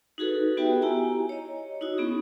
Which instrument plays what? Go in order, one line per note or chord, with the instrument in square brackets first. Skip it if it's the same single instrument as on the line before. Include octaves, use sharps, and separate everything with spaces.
[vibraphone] D#4 F#4 G#4 A4 B4
B3 F#4 G4 B4 E5 G5
E4 G4 G#5 A#5
C#5 D#5
D#4 E4 F#4 D#6
B3 C#4 G#4